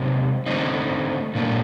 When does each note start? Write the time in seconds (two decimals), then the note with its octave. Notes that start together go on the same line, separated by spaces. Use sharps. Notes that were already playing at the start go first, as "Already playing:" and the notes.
Already playing: C3 F#3 C4 D#4
0.46 D3 A3 C4 D#4
1.35 A#2 A3 D4